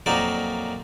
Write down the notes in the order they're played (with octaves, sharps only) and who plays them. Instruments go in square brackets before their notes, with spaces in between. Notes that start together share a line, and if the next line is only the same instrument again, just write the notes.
[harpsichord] F2 A#2 F#3 D#4 A#4 D5